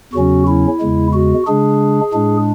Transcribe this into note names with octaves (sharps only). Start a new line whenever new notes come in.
E2 C#3 F#3 C#4 F#4
E4
E2 C#3 G#3
F#4
C#3 G#3 D4 G#4
A2 G#3 D4